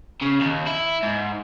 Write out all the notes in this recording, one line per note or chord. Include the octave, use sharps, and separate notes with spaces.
C#3
D#2
E4
G#2